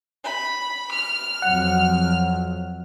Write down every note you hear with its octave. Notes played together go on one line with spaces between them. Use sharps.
B5
F6
F2 F#3 F#5